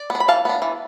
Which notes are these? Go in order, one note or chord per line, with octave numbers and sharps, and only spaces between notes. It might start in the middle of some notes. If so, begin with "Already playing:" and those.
Already playing: D5
B3 D4
B5
E3 F5 A5
B3 D4
E3